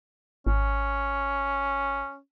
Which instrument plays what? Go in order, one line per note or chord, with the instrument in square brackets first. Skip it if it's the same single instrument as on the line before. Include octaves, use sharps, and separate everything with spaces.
[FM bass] G#1 [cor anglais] C#4